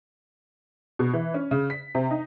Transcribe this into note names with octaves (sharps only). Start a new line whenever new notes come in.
B2
E3
C#4
C#3
B6
C3
D#4